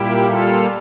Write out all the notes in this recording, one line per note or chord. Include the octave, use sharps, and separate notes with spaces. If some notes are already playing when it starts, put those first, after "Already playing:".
Already playing: A#2 G3 A#3 E4 G4
F4 A4